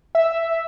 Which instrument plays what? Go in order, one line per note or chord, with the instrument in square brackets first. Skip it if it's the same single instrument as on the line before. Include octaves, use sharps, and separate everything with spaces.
[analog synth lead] E5